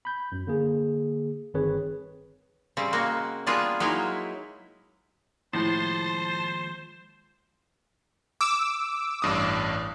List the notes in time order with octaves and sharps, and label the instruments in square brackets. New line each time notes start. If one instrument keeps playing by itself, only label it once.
[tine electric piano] B5 G6
F#2
D3 A#3 G#4
G1 D#3 C4 G#4 B4 C#5
[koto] C#3 G3 C4
G#3 A#3 F#4
G3 A#3 B3 D4 F4 G#4
F#3 G#3 A#3 D#4 E4
[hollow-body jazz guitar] D#2 F3 G#3 [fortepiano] A2 [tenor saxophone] C5 [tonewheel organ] A5 C6
[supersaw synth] D6 E6
[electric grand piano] A1 G2 D#6